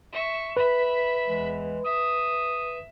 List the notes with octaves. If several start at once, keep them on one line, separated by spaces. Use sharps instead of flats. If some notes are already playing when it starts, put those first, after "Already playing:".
E5 C#6
B4 E5 B5
E2 E3 G#3
E5 D#6